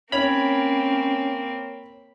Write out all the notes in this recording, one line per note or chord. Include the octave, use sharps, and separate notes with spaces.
A#3 C4 C#4 C#5 B5 G#6 F7